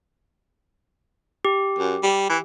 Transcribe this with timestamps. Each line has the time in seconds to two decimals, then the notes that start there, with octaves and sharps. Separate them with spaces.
1.45 G4
1.79 F#2
2.03 G3
2.30 E3